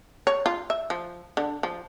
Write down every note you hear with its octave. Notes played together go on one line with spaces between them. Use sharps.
C#5
F4
E5
F3
D3
F3